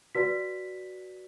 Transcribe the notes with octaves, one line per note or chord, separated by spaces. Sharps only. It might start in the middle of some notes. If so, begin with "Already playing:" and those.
F#4 B4 D5 B6